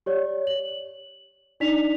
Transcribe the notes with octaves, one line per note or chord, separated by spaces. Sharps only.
G4 C#5 D5
F#7
D4 D#4 D5 B6 F7